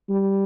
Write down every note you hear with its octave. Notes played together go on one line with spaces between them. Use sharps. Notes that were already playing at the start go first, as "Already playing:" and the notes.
G3